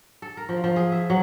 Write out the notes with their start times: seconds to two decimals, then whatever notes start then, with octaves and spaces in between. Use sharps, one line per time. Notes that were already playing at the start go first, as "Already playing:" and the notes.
0.22 A4
0.37 A#4
0.49 F3
0.64 F3
0.76 G#4
0.92 E5
1.10 F#3